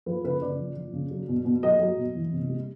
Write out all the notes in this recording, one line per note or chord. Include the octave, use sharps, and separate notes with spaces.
F3 B4
C#3 B4
C#3 D5
F3
F3
C#3
F#3
B2
B2
F#3 D#5
F#3
B2
E3
C3
G3